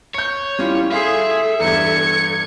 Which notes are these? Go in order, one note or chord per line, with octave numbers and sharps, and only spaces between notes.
C#5 G6 C#7
G3 C#4 E4 F4
G#4 A4 E5 F5 C6 C7
E2 G2 G#6 C#7